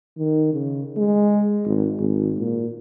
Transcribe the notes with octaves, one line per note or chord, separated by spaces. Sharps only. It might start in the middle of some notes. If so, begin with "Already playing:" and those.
D#3
C#3
G#3
G#1
G#1
A#2